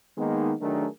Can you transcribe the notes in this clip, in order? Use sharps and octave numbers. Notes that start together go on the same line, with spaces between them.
D#3 G#3 A#3 B3 D#4
D#3 F#3 A3 D4 G#4 A#4